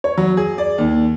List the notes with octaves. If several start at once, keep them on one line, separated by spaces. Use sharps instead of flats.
C#5
F#3
G#4
D5
D#2